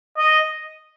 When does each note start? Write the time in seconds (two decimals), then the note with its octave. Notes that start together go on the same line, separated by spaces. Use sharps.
0.18 D#5